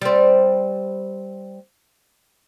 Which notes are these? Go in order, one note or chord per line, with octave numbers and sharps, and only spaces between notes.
G3 C4